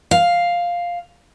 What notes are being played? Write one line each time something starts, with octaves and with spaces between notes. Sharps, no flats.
F5